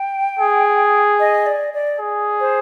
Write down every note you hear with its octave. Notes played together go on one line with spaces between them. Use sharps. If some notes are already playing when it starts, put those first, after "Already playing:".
Already playing: G5
G#4
D#5
D5
D5
G#4
C5